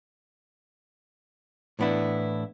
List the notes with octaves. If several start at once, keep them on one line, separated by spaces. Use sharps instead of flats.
A2 E3 B3 D4 E4